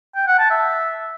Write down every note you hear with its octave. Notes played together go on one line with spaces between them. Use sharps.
G5
F#5
A5
E5